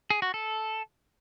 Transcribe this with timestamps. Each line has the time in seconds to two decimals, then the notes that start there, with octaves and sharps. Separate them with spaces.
0.10 G#4
0.22 F#4
0.34 A4